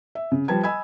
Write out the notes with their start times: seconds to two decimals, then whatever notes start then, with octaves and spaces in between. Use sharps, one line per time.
0.15 E5
0.32 C#3
0.48 F3 G3 B4 A5 G#6
0.63 D#5 G#5 B5 E6 G#6